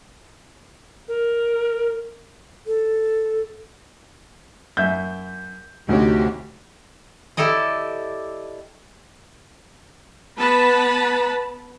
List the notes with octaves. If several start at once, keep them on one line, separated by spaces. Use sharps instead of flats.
A#4
A4
F#2 E5 G6
D2 C3 C#4 D#4 F#4 G4
E4 G4 A4 D5 D#5
B3 B4 A5 B5